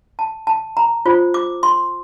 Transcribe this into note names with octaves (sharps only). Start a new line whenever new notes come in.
A5
A5
A#5
F4 C5
D6
C6